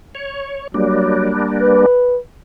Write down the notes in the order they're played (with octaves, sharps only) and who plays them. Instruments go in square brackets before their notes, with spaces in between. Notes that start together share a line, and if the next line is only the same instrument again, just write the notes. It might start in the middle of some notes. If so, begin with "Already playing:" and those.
[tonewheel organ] C#5
[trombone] F#3 [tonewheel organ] G3 A#3 D4
[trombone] B4